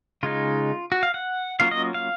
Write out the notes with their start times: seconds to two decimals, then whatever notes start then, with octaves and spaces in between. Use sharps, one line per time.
0.23 C#3 G#3 D#4 F4
0.92 F#4
1.03 F5
1.14 F#5
1.60 F#3 A#3 C#4 F4 F5
1.71 D#5
1.94 F5